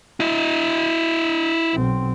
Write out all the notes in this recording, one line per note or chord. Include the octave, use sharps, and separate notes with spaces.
E4 D#5
B1 C4